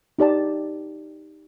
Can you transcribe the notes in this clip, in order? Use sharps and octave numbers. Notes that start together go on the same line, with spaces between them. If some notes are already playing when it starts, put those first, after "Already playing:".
D#4 G4 D5 A5